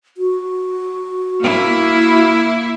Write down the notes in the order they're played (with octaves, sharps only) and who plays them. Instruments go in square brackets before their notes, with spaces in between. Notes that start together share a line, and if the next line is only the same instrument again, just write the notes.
[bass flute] F#4
[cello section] A#3 E4